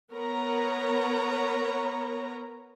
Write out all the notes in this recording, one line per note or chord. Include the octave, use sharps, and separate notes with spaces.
B3 A#4 B4 C#5 A#5